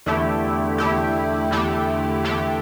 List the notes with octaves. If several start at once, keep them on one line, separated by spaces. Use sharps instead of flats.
E2 D3 A3 E4 G4
E2 D3 A3 E4 G4
E2 D3 A3 E4 G4
E2 D3 A3 E4 G4